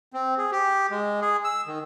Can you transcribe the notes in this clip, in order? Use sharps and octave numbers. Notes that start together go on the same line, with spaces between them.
C4
G#4
G4
G#3
G#4
E6
D#3